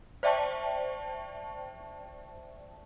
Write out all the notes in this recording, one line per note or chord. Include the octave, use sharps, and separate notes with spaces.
C5 D5 E5 G5 A5 C#6